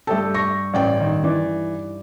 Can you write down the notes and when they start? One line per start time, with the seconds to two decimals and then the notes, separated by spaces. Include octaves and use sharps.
0.07 G2 A3 A4 G5
0.35 C#6 A#6
0.74 A1 D5 G5
1.00 D#3
1.24 E3 D5